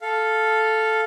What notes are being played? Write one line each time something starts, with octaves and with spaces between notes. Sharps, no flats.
A4 F5